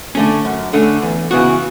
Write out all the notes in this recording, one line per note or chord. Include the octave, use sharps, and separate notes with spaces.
D3 A3 C#4
F#2
D3 A3 C#4
E2
C#3 E3 B3 F#4